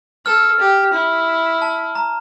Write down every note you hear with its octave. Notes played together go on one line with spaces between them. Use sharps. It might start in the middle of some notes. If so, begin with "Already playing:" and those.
A4 F6
G4
E4
A5
A#5